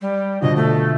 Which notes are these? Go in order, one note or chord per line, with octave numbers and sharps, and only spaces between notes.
G3
B2 D3 F3 D#5
A3